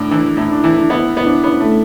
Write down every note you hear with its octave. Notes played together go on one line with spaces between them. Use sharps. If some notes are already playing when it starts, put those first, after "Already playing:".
Already playing: A2 D4
E3 D4
A2 E4
D4
E3 E4
D4
B3 E4
B3 E4
D4
B3 C#4
A3